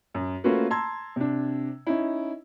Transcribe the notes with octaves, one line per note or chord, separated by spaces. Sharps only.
F#2
A3 A#3 C#4 F4 F#4 B4
A5 A#5 C6 E6 G#6
C3 D4
C#4 D#4 E4